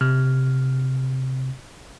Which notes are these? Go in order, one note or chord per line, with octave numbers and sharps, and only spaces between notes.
C3 F6